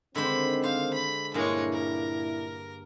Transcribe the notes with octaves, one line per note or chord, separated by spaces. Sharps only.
D3 D#3 G#3 C4 C5 B5
C5 F5
B5
G2 A#2 G#3 A#3 E4 C#5
A#4